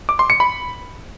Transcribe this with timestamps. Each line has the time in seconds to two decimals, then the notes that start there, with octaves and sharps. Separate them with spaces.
0.09 D6
0.19 C6
0.30 C#7
0.40 B5